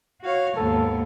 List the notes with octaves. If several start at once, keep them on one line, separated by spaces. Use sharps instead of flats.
F#4 C#5 F5
D#2 G#2 B3 A4